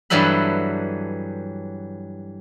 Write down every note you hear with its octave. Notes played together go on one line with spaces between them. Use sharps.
G2 E3 F#3 G3 A4 B5